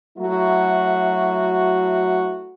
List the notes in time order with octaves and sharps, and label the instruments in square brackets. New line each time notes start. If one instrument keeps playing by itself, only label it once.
[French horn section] F#3 A3 E4 F#4